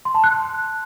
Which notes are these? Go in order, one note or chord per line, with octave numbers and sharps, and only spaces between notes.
C6
A5
F#6